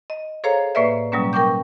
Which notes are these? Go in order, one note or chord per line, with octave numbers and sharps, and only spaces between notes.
D#5
G#4 A4 C5 C#5 F5 A#5
A2 A#3 B4 D5 E5
B2 F#3 G3 A#3 C#4
A#4 G5 C#6 D6 G6